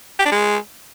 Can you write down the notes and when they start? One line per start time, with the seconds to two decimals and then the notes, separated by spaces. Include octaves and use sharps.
0.19 G4
0.25 D4
0.32 G#3